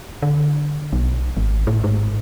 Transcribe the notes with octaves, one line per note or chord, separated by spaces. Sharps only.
D3
B1
G#1
A2
G#2